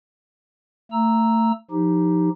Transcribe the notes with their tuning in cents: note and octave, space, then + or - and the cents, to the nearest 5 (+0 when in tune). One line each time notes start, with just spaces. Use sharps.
A3 +30 A#5 +0 E6 +0
F3 +0 D#4 +0 G4 +0